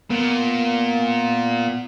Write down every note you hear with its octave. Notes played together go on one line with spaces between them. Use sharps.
A#2 B3